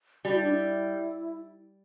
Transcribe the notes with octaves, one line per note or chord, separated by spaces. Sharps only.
G3 F#4
E4
D4
E4